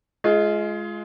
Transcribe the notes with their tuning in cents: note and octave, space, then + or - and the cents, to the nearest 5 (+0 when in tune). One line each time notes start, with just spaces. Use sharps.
G#3 +20 F4 -15